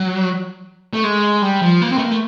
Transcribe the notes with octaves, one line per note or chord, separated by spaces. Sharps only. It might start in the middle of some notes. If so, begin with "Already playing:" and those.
Already playing: F#3
A3
G#3
G3
F3
A#3
C4
A3
A#3
A3